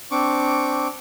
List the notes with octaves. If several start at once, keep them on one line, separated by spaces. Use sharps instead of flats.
C4 D4 C#6 D6